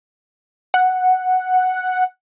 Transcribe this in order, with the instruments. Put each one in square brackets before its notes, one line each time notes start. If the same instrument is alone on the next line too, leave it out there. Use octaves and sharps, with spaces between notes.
[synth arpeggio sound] F#5